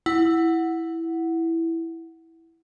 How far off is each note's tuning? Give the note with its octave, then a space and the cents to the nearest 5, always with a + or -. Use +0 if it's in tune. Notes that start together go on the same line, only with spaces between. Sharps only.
E4 +0 F#5 +0